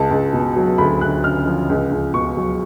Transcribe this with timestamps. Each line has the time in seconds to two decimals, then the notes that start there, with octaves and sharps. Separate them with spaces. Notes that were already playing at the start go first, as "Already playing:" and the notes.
Already playing: C#2 A5
0.11 C#2
0.33 B2
0.56 F#3
0.78 D2 B5
1.01 D2 F#6
1.24 C#3 F6
1.46 F3
1.69 C#2
1.91 C#2
2.14 B2 C#6
2.37 F#3